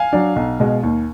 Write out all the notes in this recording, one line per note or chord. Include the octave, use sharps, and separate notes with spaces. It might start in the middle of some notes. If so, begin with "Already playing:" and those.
Already playing: F5 G#5
F#3 D4
B1
B2 G#3
D#2